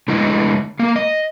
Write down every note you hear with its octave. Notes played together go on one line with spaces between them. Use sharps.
D3 G#3 A3 B3 E4 D#5
A#3 F5
D#5